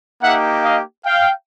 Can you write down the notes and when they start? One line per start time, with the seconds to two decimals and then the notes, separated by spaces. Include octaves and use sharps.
0.22 A#3 D#4 G4 E5 F#5
0.64 D#5 F5
1.06 F5 G5